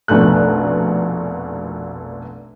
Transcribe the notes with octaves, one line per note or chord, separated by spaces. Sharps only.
F1 A#1 B2 A3 F#6